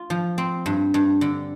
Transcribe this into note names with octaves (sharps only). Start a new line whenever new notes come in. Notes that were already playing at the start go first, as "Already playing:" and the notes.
Already playing: F4
F3
C4
G2
G2
D3